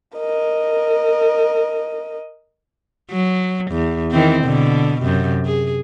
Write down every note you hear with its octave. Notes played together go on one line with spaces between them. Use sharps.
A#4 D#5
F#3
E2
D#3 E3 C4
B2 D3
F#2 C3
G#4